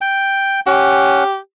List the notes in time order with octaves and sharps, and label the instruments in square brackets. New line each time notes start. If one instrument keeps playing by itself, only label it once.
[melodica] G5
[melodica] C#4 F#5 [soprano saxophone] G4